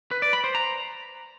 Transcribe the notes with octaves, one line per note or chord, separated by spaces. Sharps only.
B4
D5
B5
C5
A#5